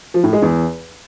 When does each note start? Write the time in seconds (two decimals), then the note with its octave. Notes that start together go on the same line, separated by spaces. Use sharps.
0.14 F3
0.24 A2
0.33 G#3
0.42 E2